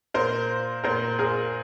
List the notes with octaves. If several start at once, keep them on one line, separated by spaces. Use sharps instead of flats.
A#2 A#4 C5
A#2 A#4 C5
G#4 A#4